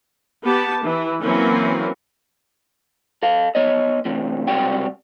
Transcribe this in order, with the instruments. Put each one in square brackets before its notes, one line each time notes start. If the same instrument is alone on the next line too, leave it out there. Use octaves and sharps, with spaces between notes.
[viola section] B3 G4 A5
E3
E3 F#3 A#3 C4 C#4 A#4
[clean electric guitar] A4 F5
B3 C#5 D#5
A2 C3 E3
C#2 C3 G3 F#4 G5